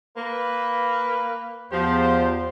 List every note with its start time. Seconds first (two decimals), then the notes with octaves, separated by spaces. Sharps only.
0.17 A#3 B4
1.72 E2 F3 G4 C5